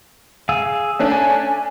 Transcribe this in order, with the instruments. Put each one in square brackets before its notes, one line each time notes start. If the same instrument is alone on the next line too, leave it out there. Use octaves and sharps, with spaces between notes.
[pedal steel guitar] G#4 F5 E6
[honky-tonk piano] A3 C#4 D4
[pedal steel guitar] G#5